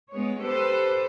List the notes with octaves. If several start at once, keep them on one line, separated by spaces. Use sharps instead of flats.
G#3 B3 C#5
G4 A4 B4 C5